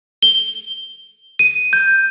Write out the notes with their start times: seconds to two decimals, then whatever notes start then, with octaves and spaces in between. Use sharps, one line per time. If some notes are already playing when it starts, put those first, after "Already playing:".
0.23 G7
1.39 D#7
1.73 G6